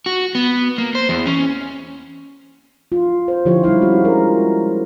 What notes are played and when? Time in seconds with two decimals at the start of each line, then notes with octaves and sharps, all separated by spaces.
0.06 F#4
0.35 B3
0.78 A#3
0.95 C5
1.09 E2
1.26 C#4
2.92 F4
3.28 C5
3.45 D3 F3 E4 F4 G4 C#5
3.64 G3 D#4 E4 F5
3.82 G3 G#3 C#4 F#4
4.05 A#4